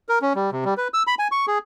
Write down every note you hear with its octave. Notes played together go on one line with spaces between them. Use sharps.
A#4
C#4
G3
C3
G3
B4
E6
B5
G#5
C#6
G#4